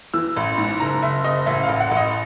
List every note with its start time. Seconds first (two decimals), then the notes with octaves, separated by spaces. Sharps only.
0.14 E3 E6
0.36 A1
0.58 G#2
0.80 F#1 A#5
1.02 F#1 E5
1.24 F#1 D#5
1.46 A1 E5
1.63 F5
1.69 A1
1.80 F#5
1.91 A1
1.97 D#5